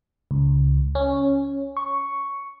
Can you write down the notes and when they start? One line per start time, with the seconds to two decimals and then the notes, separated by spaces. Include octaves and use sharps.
0.31 C#2
0.95 C#4
1.77 C#6